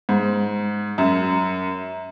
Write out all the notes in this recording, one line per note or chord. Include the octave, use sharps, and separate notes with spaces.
G#2
F#2